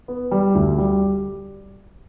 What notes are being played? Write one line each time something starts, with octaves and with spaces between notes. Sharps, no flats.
B3
G3
D2
G3